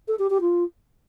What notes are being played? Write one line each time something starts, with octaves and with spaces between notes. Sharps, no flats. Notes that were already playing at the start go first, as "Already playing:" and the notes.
A4
G4
G4
F4